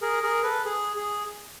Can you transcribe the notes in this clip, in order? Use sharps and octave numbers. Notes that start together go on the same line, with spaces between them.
G#4 A#4
G#4 A#4
A4 B4
G#4
G#4